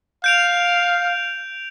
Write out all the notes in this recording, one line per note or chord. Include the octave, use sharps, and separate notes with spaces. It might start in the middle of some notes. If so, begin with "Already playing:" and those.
F5 G6 D7 F7